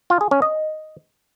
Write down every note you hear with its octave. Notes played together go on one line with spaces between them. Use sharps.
F4
G#4
C#4
D#5